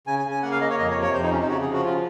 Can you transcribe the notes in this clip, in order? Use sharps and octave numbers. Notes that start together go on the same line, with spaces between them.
C#3 G#5
G#5
C#3
G#5
A#3 F#5
F5
A#3 D#5
C#5
F2 D#5
C#5
C3
C#5
F2 C5
D#4
C3 C#4
D#4
C#3 F#4
G#4
F3
F#4
C#3 F4